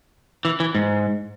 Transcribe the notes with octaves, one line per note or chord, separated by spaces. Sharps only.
E3
E3
G#2